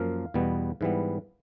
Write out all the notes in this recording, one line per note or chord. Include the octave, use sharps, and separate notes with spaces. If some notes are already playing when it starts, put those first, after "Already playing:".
Already playing: F#2 F3 A#3 F5
E2 B2 G3 B3
G#2 E3 G3 B3